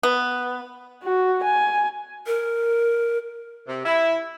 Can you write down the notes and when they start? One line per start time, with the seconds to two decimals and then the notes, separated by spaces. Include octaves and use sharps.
0.03 B3
1.03 F#4
1.44 G#5
2.27 A#4
3.67 C3
3.85 E4